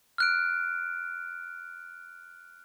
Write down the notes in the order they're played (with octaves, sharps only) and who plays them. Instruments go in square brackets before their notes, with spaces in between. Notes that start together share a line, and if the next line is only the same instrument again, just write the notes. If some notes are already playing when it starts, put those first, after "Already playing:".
[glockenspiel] F6 F#6 D7